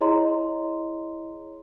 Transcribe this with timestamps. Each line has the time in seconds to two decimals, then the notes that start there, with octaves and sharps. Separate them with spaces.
0.01 E4 G#4 C#5 D#5 A#5 C6